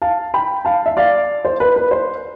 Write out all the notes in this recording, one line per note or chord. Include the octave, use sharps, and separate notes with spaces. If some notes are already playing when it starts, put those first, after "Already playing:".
F5 A5
G5 B5
F5 A5
E5
D5 F5
C5
B4
B4
C5